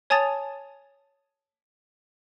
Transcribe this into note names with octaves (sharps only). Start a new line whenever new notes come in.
C#5 G#5 A5 D#6 A6 F7